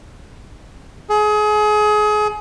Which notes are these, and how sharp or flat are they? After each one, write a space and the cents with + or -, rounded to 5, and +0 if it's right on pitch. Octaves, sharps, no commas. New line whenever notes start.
G#4 +30